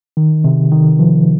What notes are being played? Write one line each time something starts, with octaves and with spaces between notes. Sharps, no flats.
D#3
C3
D#3
F3